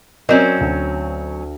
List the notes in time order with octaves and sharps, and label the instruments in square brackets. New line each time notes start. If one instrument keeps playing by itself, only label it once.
[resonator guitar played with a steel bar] F#3 C4 C#4 [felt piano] A#4 D5 D#5
[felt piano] D2